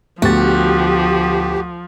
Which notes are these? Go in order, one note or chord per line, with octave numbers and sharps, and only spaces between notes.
D2 F3 B3 F#4 G4 A6